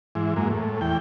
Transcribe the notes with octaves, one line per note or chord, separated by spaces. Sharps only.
G#2 E3
F#2 G#3 A#3
A2
E2 G5